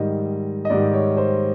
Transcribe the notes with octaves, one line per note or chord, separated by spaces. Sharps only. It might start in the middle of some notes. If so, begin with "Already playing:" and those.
Already playing: G#2 D#3 G3 D#5
D#5
G#2 D#3 G3 D5
C#5
C5